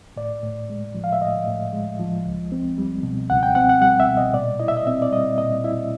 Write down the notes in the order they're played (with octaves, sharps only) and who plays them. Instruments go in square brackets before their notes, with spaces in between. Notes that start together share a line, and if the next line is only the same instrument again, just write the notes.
[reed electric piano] A2 D5
A2
G#3
F3
F5
E5
A2 D#5
A2
G#3
F3
C#2
C4
G3
B2
C#2 F#5
G5
C4 F#5
F#5
G3 F#5
E5
B2
D#5
A#2 D5
E4 D#5
E5
D#5
C4 E5
D5
G3 D#5
A#2 D#5
E4 E5